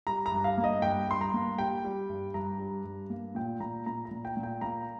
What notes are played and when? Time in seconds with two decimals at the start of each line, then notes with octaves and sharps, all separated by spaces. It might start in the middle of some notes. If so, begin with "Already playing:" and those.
0.07 G3 A#5
0.26 A#5
0.32 G2
0.44 F5
0.58 A#3
0.64 D#5
0.82 G2 G5
1.08 G2 C6
1.21 A#5
1.34 A#3
1.58 G3 G5
1.84 G3
2.09 G2
2.34 G2 A#5
2.59 G3
2.85 G2
3.10 A#3
3.35 A#2 G5
3.60 A#2 A#5
3.86 A#2 A#5
4.05 A#5
4.11 A#2
4.25 G5
4.37 A#2
4.43 G5
4.61 A#3 A#5